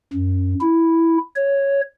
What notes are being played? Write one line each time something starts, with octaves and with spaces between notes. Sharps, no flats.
F#2
E4
C#5